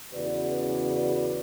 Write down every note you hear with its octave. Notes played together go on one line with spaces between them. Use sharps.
E2 C#3 F#4 B4 D5